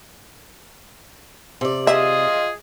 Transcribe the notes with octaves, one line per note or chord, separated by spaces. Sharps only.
C3 D5
F4 G#4 D#5 E5